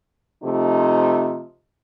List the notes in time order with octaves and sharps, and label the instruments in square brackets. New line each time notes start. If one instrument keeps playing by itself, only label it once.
[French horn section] C3 F3 A3 D#4